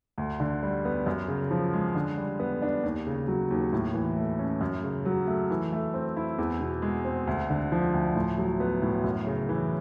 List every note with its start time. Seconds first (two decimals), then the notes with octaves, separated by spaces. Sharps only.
0.18 D2
0.40 D3
0.63 G3
0.85 B3
1.06 F#2
1.28 C#3
1.51 F3
1.73 G#3
1.95 D3
2.17 G3
2.40 B3
2.62 D4
2.83 D#2
3.07 C#3
3.28 F#3
3.51 D#2
3.73 A2
3.94 E3
4.17 A3
4.39 C#4
4.61 F#2
4.83 C#3
5.05 F#3
5.27 A3
5.50 E3
5.73 A3
5.94 C4
6.17 E4
6.38 E2
6.61 B2
6.82 G#3
7.05 C4
7.27 D2
7.50 D3
7.72 F3
7.94 D2
8.15 A2
8.38 F#3
8.60 B3
8.82 A2
9.04 F#2
9.27 C#3
9.49 E3